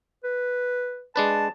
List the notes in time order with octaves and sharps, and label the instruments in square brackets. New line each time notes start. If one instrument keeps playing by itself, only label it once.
[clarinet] B4
[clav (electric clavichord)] G#3 D4 B4 [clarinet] A5